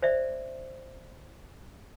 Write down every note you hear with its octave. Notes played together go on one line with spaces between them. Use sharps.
C5 D5 E5